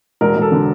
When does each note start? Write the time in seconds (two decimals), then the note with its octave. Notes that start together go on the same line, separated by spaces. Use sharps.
0.21 E1 A#4
0.36 E1
0.42 A4
0.52 D3